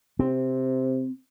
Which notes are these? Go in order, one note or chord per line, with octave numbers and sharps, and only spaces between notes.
C3 C4